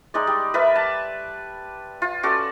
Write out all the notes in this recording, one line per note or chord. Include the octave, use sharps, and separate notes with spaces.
G#3 D#4 D5
G3
A#4 B4 D5 E5
A5
F4
C#4 F#4 A4 D5